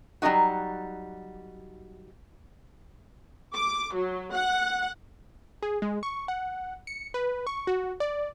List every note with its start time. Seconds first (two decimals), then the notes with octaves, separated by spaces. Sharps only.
0.22 F#3 G3 C#4 D#4 F#4
3.54 D6
3.95 F#3
4.33 F#5
5.63 G#4
5.82 G#3
6.03 C#6
6.28 F#5
6.87 C#7
7.14 B4
7.47 C#6
7.67 F#4
8.00 D5